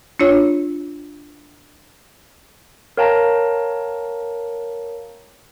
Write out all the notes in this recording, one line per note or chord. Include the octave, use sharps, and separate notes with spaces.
D4 F4 C#5
A#4 C#5 F5 G5 A5 A#5